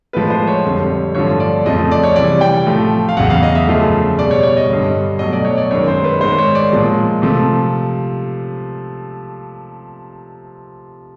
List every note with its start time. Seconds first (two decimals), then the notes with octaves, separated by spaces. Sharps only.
0.13 A2 F3 G#3 B4
0.30 C5
0.47 C#5
0.65 F2 D3 G3
1.15 G2 D3 F3 A3 C#5
1.40 D5
1.65 F2 C#3 F3 A3 D#5
1.91 D5
2.03 C#5
2.16 C3 E3 G3 D5
2.41 G5
2.66 A2 F3 A3
3.09 F5
3.17 E2 C#3 F#3 F#5
3.30 F5
3.43 D#5
3.55 E5
3.67 F#2 C#3 F3 A3
4.18 B2 G3 D5
4.31 C#5
4.43 C#5
4.57 D#5
4.69 G2 D3 G3
5.19 B2 F#3 A3 D#5
5.32 D5
5.45 C#5
5.57 D5
5.71 F#2 D#3 G#3 C#5
5.88 C5
6.04 B4
6.20 G#2 D#3 G#3 C5
6.38 C#5
6.55 D5
6.72 A#2 F3 G#3
7.22 C3 F3 A3